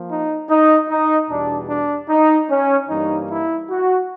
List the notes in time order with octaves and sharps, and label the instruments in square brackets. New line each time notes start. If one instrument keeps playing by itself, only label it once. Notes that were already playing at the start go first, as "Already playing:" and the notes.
Already playing: [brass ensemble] F3 A#3
D#4
D#4
D#4
E2 B2 G3 D4
D4
D#4
C#4
G2 E3 G3 A#3 D#4
E4
F#4